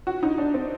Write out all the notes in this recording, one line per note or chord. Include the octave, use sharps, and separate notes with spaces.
F#4
D#4
D4
C4